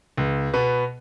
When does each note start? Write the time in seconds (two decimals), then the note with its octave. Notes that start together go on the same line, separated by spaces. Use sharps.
0.17 C#2
0.53 B2 B3